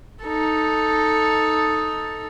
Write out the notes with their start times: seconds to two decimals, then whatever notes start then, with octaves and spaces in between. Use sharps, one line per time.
0.24 D#4 A4